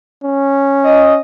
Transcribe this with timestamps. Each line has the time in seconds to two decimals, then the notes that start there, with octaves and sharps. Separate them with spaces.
0.24 C#4
0.84 D#5